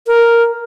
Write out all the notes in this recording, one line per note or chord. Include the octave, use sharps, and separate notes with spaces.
A#4